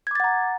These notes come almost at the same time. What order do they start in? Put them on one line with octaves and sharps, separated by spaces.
G#6 D6 A6 F#5 A#5